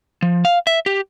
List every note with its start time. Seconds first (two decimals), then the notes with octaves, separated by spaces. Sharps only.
0.22 F3
0.45 F5
0.67 E5
0.86 G4